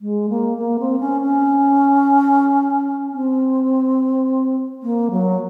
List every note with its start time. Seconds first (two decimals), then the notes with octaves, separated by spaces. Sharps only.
0.01 G#3
0.30 A#3
0.58 A#3
0.79 C4
1.00 C#4
1.22 C#4
3.13 C4
4.83 A#3
5.11 F#3